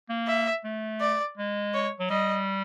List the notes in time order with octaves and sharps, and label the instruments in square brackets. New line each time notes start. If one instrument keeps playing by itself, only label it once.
[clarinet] A#3
[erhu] E5
[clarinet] A3
[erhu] D5
[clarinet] G#3
[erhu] C#5
[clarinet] F#3
[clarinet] G3 [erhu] D#5